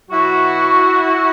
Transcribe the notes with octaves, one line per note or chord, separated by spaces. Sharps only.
B2 F#3 E4 F#4